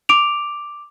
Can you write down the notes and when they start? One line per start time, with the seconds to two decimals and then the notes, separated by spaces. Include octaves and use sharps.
0.09 D6 D7 F7